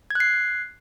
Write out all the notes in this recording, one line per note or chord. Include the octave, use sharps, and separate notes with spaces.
F#6 G#6 C7